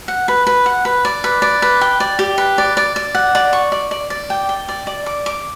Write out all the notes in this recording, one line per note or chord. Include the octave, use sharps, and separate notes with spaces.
F#5
B4
B4
F#5
B4
D5
B4
D5
B4
G5
D5
G4
B4
D5
D5
D5
F#5
D5
C#6
D5
D5
D5
G5
G5
D5
D5
D6
D6